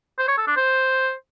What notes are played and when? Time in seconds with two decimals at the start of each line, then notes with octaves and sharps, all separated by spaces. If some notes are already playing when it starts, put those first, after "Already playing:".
0.18 C5
0.28 C#5
0.38 A4
0.47 D4
0.57 C5